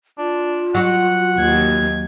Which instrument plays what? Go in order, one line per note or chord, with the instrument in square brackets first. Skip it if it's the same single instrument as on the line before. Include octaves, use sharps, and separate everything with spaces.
[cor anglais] D4 [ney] F4
[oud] F#3 F#4 [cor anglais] F#5
[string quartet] D#2 G#6